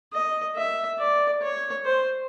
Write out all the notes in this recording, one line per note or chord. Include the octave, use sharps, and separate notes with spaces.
D#5
E5
D5
C#5
C5